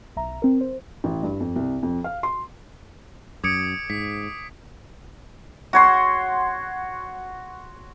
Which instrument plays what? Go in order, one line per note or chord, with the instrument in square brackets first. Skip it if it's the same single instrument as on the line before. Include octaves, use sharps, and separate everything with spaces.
[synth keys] B1 E5 A#5
C4 A#4
C5
[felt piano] A1
G2
F2
C2
F2
F5
C6
[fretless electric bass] F#2 [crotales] D6 D#6 D7 [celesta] G#6 C#7
[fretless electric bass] G#2 [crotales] B6
[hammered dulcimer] F#4 C#5 C6